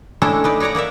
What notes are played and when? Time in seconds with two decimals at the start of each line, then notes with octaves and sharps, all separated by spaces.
0.22 G#3 A3 C#4 D4 E4 A4
0.44 D#4 B4 D5
0.60 D#4 C#5 D5 F#5 A#5
0.75 A#3 A#4 D5 E5